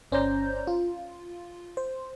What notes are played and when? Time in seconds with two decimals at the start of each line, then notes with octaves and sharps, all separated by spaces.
0.12 G1 C#4 C5 D5 A#5 G6
0.67 F4
1.77 C5